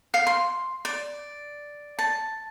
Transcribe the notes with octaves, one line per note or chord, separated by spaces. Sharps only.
F5
C6
D5
A5